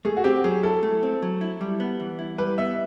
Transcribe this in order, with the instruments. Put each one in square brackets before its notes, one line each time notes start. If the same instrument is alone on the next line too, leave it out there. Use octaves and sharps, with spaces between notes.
[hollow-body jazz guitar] A3 [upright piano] G#4
[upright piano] F#4
[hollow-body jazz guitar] C4 [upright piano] G4
[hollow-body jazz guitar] F#3 [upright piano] G#4
[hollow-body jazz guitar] E4 [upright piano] A4
[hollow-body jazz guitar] A3
C4
F#3
E4
G3
B3
E3
E4
[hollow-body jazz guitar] G3 [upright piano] B4
[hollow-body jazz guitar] B3 [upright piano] E5